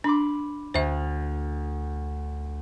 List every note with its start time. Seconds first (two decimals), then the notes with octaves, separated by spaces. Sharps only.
0.04 D4 B5 C6 D6
0.74 D2 C5 E5